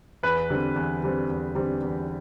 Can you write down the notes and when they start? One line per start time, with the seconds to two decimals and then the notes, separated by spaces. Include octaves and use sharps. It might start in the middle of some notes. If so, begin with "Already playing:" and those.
0.23 E2 B4
0.50 D3 G3 C4
0.76 E2
1.03 D3 G3 C4
1.30 E2
1.55 D3 G3 C4
1.82 E2